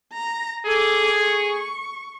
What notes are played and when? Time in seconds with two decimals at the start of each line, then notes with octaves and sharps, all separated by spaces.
0.13 A#5
0.66 G#4 A4 D6
1.24 C#6